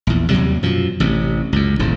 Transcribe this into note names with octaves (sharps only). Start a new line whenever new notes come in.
A#1 E2
D#2 C3 F#3 G3
F#2 B2 F3
A1 C3
C#2 F#2
D#1 A1 G#2